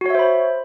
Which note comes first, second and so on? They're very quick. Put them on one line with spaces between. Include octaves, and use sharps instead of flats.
F#4 C#5 E5 C5 B5